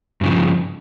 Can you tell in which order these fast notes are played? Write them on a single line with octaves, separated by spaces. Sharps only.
G2 C#3 F3